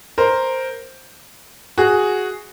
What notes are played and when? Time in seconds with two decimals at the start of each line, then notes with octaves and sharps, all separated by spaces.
0.18 A#4 C5
1.78 F#4 G#4